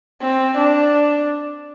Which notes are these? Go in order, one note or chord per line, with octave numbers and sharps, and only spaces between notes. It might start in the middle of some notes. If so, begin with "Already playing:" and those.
C4
D4